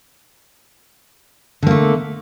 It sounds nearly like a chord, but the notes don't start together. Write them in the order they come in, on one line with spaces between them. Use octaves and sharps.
D3 A#3 A3